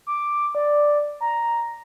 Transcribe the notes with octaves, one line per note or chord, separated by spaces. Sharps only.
D6
D5
A#5